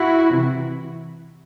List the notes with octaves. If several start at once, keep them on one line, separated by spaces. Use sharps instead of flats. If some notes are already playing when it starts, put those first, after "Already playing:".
Already playing: E4 F#4
C3 E3